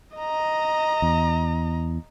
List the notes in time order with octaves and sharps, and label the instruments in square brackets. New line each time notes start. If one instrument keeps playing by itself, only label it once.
[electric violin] D#5 A#5
[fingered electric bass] E2